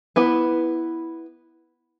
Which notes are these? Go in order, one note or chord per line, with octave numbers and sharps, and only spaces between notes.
B3 E4 B4